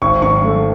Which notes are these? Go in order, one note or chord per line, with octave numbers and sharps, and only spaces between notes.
G#1 C#6
D#3 C#6
A3